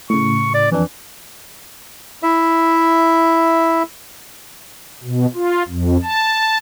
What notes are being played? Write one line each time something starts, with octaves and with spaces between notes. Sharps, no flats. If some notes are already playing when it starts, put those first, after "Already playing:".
A2 C#3 C#6
D5
F2 E3 D4
E4 E5
B2
F4
F2
A5